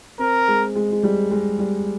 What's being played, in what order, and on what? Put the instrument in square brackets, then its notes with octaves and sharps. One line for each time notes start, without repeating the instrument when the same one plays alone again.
[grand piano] C4 [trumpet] A#4
[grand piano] G#3
G#3
G#3
G3
G#3
G3